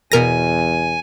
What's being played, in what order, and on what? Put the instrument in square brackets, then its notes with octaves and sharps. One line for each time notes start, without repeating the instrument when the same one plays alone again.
[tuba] E2 [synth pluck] B2 A#4 A#6 [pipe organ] G#5